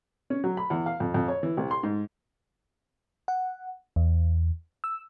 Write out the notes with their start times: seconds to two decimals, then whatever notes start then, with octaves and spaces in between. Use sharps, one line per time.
0.30 C#4
0.44 F#3
0.57 B5
0.70 E2
0.86 F5
1.00 F2
1.14 F2
1.28 C#5
1.43 E3
1.57 C2
1.71 C6
1.83 G#2
3.28 F#5
3.96 E2
4.84 E6